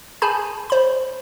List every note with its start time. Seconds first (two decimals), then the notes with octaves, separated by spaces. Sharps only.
0.22 G#4 G#5 A5 B5 G6
0.70 C5 B5